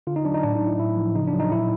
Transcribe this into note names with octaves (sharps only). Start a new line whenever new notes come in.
D3 F4
D#4
F#3 D4
D#4
A2 D4
D#4
F#3
E4
A2 E4
F3
C#3 D#4
D4
F#3
D#4
A#2 E4